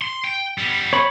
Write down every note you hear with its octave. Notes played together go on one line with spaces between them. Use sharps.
C6
G5
G3 B3
C#5 B5